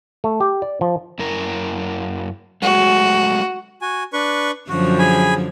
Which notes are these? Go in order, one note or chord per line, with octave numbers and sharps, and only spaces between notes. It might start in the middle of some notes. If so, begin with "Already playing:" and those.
A3
G4
D5
F3
F#2 E4 A#4
F#3 G#3 A3 F#4
F#4 G#5
D4 B4 C#6
F#2 D3 F3 F#4
G#4 G#5 B5